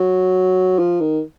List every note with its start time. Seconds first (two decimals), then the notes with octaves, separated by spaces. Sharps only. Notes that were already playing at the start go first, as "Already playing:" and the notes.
Already playing: F#3
0.79 F3
1.01 D#3